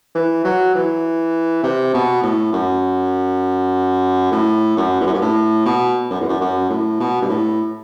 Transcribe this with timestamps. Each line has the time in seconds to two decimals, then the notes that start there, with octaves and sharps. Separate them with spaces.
0.15 E3
0.44 F#3
0.75 E3
1.63 C3
1.94 B2
2.23 A2
2.53 F#2
4.32 A2
4.77 F#2
5.00 E2
5.06 F#2
5.14 G2
5.22 A2
5.66 B2
6.11 F#2
6.20 E2
6.29 F#2
6.41 F#2
6.70 A2
7.00 B2
7.22 G2
7.29 A2